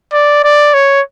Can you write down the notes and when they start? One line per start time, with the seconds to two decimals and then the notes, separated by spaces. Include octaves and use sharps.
0.13 D5
0.44 D5
0.74 C#5